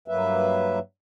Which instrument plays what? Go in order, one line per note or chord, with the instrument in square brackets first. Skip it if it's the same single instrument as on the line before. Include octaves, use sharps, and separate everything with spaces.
[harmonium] G2 F#3 A#3 B4 E5